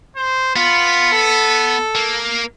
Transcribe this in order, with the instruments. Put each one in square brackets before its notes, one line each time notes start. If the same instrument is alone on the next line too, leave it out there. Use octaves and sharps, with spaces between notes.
[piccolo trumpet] C5
[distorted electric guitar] B3 [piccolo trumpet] F4
[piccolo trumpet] A4
[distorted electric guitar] A#3